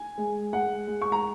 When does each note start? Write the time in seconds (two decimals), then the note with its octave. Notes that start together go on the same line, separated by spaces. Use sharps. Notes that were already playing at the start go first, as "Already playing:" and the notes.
Already playing: G#5
0.18 G#3
0.53 G#3 F#5
0.87 G#3
1.01 C#6
1.12 A#5